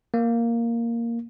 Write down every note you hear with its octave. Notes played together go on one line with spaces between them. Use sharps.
A#3